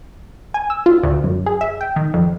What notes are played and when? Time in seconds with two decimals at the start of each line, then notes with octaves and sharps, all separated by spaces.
0.54 G#5
0.70 E6
0.86 F4
1.03 D2
1.24 F#2
1.46 G#4
1.61 E5
1.81 G5
1.96 D#3
2.14 F2